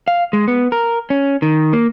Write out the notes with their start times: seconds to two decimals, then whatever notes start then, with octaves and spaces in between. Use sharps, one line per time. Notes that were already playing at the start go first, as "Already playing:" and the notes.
0.08 F5
0.33 G#3
0.48 B3
0.72 A#4
1.10 C#4
1.42 D#3
1.73 A#3